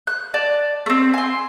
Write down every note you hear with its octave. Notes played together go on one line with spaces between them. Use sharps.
F#6
D5 A5
A3 C4
G#5 C6